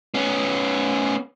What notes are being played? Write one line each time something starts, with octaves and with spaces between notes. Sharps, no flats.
B3 C#4